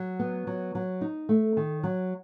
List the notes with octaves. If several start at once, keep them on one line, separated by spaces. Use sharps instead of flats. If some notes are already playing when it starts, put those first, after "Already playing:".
Already playing: F#3
B3
F#3
F#3
D#4
A3
D#3
F#3